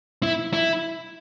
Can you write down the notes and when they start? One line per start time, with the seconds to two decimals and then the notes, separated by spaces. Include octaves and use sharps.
0.23 E4
0.53 E4